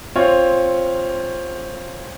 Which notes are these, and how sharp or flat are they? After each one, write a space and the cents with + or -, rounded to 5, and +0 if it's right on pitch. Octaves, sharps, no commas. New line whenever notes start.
C4 +10 F4 +0 C#5 +0